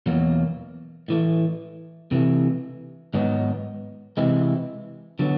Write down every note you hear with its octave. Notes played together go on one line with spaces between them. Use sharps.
E2 B2 F#3 A#3
A2 E3 A3
C3 E3 A3
G#2 D#3 F#3 B3 D#4
C3 E3 G#3 C4 E4
D3 F#3 B3